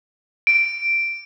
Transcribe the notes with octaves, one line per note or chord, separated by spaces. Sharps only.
D7